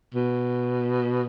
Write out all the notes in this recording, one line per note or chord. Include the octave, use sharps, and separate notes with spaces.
B2